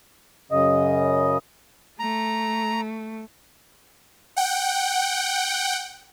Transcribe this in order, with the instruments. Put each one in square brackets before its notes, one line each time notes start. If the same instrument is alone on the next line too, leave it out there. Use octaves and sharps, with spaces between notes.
[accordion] F#2 C#3 D#5
[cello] A3 [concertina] A#5
[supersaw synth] F#5 G5